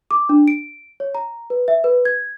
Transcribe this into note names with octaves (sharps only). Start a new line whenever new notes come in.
D6
D4
D7
C#5
A#5
B4
E5
B4
G#6